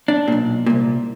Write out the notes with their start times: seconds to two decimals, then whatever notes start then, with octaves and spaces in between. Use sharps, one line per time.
0.08 D4
0.28 B1 A#2
0.66 C2 A#2